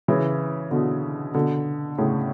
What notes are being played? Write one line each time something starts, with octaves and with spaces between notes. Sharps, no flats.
C#3 E3
B2 D3
B2 D3
A2 C#3